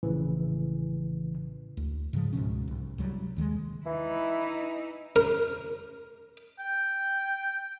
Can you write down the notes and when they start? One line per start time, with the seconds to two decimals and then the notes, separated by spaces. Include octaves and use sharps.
0.03 A#1 A2 C#3 E3
1.77 D2
2.13 G#2 C#3 F3
2.33 C#2 G#2 B2 C#4
2.68 C2
2.98 C2 F#3 G3
3.37 D#2 D#3 F#3 G#3
3.86 E3 D#4 E4
5.16 A#4
6.59 G5